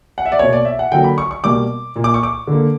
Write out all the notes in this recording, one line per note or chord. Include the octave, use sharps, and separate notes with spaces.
F#5
E5
D5
B2 A#3 C#5
D5
E5
F#5
D3 F#3 A#3 G5
B5
C#6
C#6
B2 G3 A#3 D6
A#2 A#3
D6
C#6
D6
D3 A#3